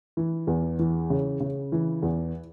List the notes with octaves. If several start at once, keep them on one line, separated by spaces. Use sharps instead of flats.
E3
E2
E3
C#3
C#3
E3
E2